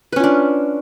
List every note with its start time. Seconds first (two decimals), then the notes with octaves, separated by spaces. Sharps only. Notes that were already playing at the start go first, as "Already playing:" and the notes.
0.12 B4
0.16 C#4
0.20 F4
0.24 D4